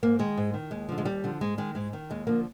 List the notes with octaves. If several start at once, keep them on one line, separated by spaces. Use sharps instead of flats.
G#2 A#3
D#3 G#3
G#2
D#3
D#2 G#3
D3 F3
G#3
D#2 G3
D3 F3
G#2 G#3
D#3 G#3
G#2 G#3
D#3
D#2 G#3
D3 F3 A#3